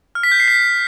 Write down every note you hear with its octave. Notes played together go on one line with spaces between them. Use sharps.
F6
B6
G6
C7
B6